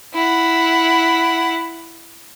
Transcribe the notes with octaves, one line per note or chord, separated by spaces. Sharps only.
E4 F#5